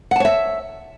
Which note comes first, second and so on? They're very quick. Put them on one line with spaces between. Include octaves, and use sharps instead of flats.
F#5 A5 C#5 E5